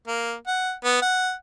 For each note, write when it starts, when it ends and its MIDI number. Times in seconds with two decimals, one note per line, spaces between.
0.07 0.34 58
0.47 0.72 78
0.85 1.00 59
1.02 1.33 78